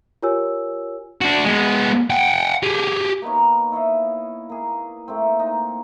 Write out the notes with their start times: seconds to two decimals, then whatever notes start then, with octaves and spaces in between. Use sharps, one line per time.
0.23 F4 G4 A#4 C#5 G#5 E6
1.21 D4 F#4
1.45 G#3 B3
2.10 F#5 G5
2.63 G4 G#4
3.22 A#3 B3 D#4 C#5
3.72 E4 C#5 D#5 F5
4.49 A#3 G#4
5.08 A3 A#3 C4
5.39 D#4